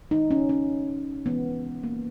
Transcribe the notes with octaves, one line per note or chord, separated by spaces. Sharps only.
D#3 G#3 D#4
C#4
C#4
C#3 E3 G#3 B3
A#3